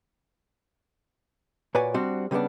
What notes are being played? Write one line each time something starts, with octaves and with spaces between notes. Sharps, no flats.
A#2 F#4 B4 C#5 D5 G#5
G3 C4 D4 F#4
C#3 G3 G#3 B3 D4